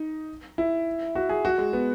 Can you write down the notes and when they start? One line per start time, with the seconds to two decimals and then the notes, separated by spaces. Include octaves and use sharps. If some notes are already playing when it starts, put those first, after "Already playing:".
Already playing: D#4
0.58 E4
1.15 F#4
1.29 G#4
1.45 F#4
1.58 G#3
1.73 B3